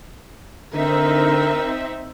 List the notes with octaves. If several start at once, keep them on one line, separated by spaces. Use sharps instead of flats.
D3 C4 D#4 A#4 E5